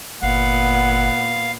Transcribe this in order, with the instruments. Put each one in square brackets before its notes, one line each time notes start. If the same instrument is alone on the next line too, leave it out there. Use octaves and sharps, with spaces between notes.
[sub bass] G1 [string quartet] A#2 B3 [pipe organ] F5 [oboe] F#5